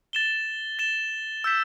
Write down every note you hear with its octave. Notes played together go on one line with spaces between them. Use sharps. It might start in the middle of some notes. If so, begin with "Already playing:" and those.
A6 E7 G7
A6 E7 G7
E6 G6 B6 E7